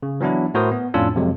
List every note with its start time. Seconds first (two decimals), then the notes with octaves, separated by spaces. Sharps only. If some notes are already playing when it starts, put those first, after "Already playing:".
0.03 C#3
0.20 E3 F#3 B3 D4 E4
0.54 A2 E4 F#4 A#4 C5 D#6
0.71 B3
0.94 F2 A2 C#4 D4 F4 E6
1.15 F2 C3 F#3 G#3